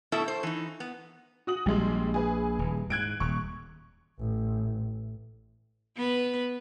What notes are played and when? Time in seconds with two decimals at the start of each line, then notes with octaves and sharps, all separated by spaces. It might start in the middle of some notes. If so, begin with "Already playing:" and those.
0.12 B2 A3 E4 A4 E5
0.28 C5
0.43 E3 D#4
0.80 B3
1.47 F#4 D#6 F#7
1.66 A#1 G3 G#3
2.14 G#4 B4
2.59 D#1
2.90 G#2 F#6 G#6 D7
3.20 D#1 C#6
4.19 A1
5.96 B3 B4